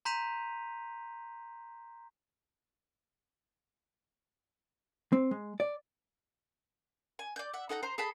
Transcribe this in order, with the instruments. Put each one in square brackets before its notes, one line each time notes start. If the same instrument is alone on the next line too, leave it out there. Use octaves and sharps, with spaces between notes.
[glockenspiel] A#5 C6 G6 B6 D#7 F7
[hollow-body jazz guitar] C4
G#3
D5
[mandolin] G#5
D5 G6
E5 F#5
D#4 A4 F#5 A#5
C5 A#5
G#4 A4 A5 B5